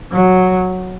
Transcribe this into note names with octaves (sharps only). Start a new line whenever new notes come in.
F#3